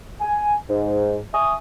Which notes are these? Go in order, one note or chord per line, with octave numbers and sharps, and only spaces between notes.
G#5
G#2
E5 G#5 C#6 D#6